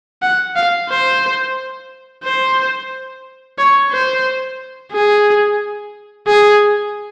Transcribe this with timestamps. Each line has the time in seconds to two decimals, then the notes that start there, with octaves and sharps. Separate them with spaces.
0.22 F#5
0.56 F5
0.90 C5
2.24 C5
3.58 C#5
3.92 C5
4.92 G#4
6.27 G#4